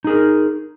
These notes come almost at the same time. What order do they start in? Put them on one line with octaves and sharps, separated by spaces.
D#4 G#4 A#4